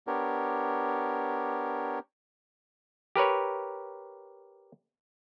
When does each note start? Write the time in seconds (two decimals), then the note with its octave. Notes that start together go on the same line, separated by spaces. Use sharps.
0.07 B3 D4 G4 A#4 C#5
3.16 G4 A#4 B4 C#5